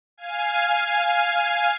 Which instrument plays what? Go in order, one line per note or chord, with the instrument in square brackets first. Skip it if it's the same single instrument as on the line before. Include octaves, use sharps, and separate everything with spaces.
[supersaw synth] F5 G#5